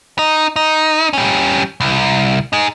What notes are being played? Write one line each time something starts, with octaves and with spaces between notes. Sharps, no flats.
D#4
D#4
G3 C#4
C2
D#4 G#4